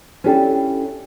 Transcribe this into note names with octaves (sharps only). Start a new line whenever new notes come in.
C#4 D4 E4 G4 A4